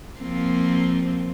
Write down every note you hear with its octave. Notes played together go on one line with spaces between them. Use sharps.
F3 A#3 C4